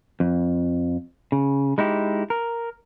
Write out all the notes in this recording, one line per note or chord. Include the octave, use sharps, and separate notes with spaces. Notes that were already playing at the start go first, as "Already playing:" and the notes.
F2
C#3
G#3 D#4 E4 G4
A#4